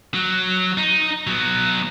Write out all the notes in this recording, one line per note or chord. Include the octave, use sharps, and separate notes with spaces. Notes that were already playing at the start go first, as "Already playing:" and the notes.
F#3
D#4
F#3 B3